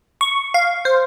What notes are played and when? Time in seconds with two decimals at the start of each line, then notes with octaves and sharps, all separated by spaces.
0.21 C#6
0.54 F5
0.85 C5